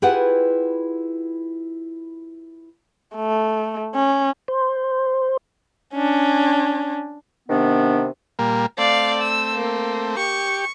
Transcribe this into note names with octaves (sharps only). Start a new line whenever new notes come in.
E4 F4 G4 G#4 B4 F#5
A3
C#4
C5
C#4 D4
C3 D#3 B3 D4
A#2 G3 A#3
A3 C4 D5 F5
E6
A#3
G4 C#6